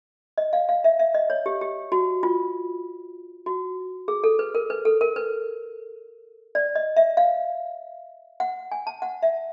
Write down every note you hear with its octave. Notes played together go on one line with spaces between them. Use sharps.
D#5
F5
F5
E5
E5
D#5
C#5
G4
G4
F#4
F4
F#4
G#4
A4
B4
A#4
B4
A4
A#4
B4
D5
D#5
E5
F5
F#5
G#5
A5
F#5
E5